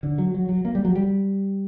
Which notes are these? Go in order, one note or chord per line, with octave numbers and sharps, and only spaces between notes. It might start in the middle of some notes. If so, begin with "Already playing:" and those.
D3
F#3
F#3
F#3
A#3
G3
F#3
G3